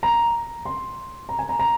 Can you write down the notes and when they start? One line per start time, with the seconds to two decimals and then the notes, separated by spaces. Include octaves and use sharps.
0.03 A#5
0.65 C6
1.29 A#5
1.39 G#5
1.49 A#5
1.59 A#5